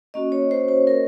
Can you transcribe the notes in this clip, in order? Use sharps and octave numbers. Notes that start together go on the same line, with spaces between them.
A#3 C#4 F#4 D#5
C#5
C5
C5
A#4